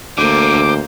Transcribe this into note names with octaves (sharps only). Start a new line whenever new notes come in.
D2 D3 A#3 C5 D6